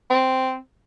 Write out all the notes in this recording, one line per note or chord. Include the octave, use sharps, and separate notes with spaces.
C4